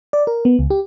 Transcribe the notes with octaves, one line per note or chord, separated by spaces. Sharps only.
D5
A#4
B3
C#2
G4